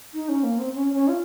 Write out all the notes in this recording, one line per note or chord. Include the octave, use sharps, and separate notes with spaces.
D#4
C#4
A#3
C4
C#4
C#4
F4